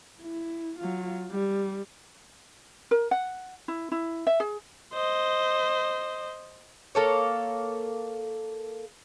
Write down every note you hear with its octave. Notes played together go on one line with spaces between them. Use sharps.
E4
F#3 F4
G3
A#4
F#5
E4
E4
E5
G#4
C5 D#5
A#3 A4 C#5